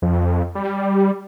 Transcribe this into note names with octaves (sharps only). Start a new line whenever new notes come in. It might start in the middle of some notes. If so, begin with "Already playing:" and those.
F2
G3